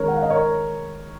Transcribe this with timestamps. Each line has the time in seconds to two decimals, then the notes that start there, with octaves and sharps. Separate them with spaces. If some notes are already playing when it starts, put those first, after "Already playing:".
Already playing: D#3 G#3 C#4 A#4 C#5
0.08 F#5
0.16 F5
0.22 D#5
0.30 A#4 C#5